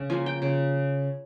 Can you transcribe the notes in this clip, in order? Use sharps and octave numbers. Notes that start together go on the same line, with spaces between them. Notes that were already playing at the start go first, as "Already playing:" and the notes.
Already playing: C#3
F3 A#3 G#5
G5
C#3